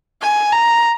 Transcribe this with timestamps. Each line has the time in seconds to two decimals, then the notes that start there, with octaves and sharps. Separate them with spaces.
0.22 G#5
0.52 A#5